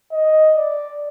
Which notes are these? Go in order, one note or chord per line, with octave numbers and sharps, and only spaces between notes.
D#5
D5